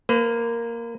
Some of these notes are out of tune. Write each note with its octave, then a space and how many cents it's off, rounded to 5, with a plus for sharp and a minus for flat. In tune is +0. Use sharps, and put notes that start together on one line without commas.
A#3 +0 B4 +40